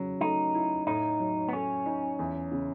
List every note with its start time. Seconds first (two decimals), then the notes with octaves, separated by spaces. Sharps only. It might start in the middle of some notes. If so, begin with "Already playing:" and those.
Already playing: C#3 F#3
0.21 A3 D#4
0.54 E4
0.87 A2 D#4
1.20 F#3
1.49 B3
1.53 A3 C#4
1.86 D#4
2.19 E2
2.52 C#3